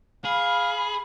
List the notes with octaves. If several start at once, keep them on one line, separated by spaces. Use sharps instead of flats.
G#4 F5 B5